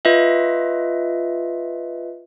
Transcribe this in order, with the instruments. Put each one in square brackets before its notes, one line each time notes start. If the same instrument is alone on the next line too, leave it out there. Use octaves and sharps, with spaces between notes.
[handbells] F4 B4 D#5 E5